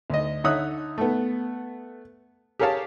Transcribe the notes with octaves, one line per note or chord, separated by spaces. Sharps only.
D2 D#5
D3 D#4 C#5 E5 D#6 F#6
A3 B3
G4 G#4 A#4 C#5 F5 A5